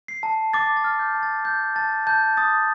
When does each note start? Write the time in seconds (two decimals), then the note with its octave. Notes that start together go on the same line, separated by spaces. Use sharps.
0.08 C7
0.23 A5
0.53 D6 A6
0.77 A6
0.84 F6
0.99 G6
1.15 A5
1.23 A6
1.45 G6
1.76 A5 A6
2.07 A5 G6
2.37 D#6 A6